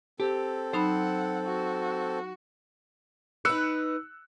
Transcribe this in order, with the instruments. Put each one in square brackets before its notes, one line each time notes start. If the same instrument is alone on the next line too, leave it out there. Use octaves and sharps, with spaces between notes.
[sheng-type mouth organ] C4 A4 [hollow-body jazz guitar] G4
[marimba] F#3 D#4 B5 [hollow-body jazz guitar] C5 [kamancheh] F#5
[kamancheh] F#4
[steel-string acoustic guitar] D#4 B4 [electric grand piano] E6 F#6 C#7